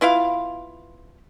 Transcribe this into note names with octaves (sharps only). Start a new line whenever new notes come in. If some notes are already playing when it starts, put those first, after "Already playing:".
B3 E4 F4 F5